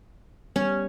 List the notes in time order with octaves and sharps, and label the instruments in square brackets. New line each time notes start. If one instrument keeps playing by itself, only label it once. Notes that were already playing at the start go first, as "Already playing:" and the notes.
[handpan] G3 B3 [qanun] C#4